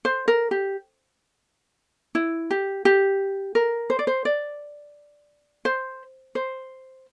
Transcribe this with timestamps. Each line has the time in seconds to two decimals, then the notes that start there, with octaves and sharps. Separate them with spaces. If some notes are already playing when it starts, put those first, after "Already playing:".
0.05 C5
0.28 A#4
0.51 G4
2.15 E4
2.51 G4
2.85 G4
3.55 A#4
3.90 C5
3.99 D5
4.07 C5
4.25 D5
5.65 C5
6.35 C5